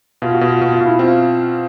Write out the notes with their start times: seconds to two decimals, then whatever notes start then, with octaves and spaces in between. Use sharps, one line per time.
0.22 B2 F4
0.35 F#4
0.41 B2
0.48 F4
0.61 B2
0.73 F4
0.81 B2
0.86 E4
0.99 C4 F4